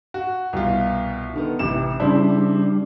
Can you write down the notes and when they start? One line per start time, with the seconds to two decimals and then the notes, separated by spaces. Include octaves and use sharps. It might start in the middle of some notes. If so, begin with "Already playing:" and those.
0.14 F#4
0.53 C2 B2 F4
1.33 D3 D#3 B3
1.59 A1 C3 E7
2.00 C#3 G3 D4 E4 C5